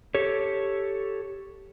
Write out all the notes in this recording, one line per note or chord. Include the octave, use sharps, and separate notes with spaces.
G4 A4 C#5